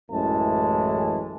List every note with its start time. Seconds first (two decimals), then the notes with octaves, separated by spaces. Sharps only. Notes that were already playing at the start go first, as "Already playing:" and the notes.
0.11 A1 F#2 E3 G#3 A3 A5